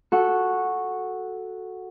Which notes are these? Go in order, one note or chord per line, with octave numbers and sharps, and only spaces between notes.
F#4 A4 F#5 C#6